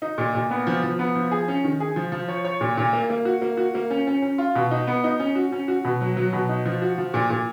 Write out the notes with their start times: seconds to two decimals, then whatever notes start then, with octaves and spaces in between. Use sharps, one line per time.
0.02 D#4
0.18 A#2
0.35 A#2
0.51 B3
0.67 F3
0.83 F3
0.99 B3
1.15 F3
1.31 G#4
1.48 C#4
1.64 D#3
1.80 G#4
1.96 F3
2.12 F3
2.29 C#5
2.45 C#5
2.61 A#2
2.77 A#2
2.93 A#3
3.10 A#3
3.25 F#4
3.42 A#3
3.57 F#4
3.75 A#3
3.90 C#4
4.07 C#4
4.22 C#4
4.38 F4
4.55 B2
4.71 D#4
4.87 B3
5.04 D#4
5.20 C#4
5.35 F#4
5.52 C#4
5.68 F#4
5.84 B2
6.01 F#3
6.17 F#3
6.33 B2
6.49 D#4
6.65 F3
6.82 F#4
6.98 F3
7.14 A#2
7.30 A#2